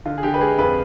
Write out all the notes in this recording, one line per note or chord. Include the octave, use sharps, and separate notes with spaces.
D3 F4
G#4
D3 G4
B4
G#3 G#4
F2 B4